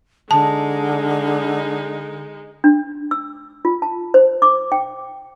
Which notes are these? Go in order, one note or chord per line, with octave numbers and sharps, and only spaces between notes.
D3 G#3 D#4 A5
D4
E6
F4
A5
C5
D6
G5